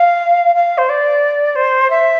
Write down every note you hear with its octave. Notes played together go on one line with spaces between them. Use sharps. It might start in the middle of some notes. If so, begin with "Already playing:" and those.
Already playing: F5
F5
C5
D5
C5
E5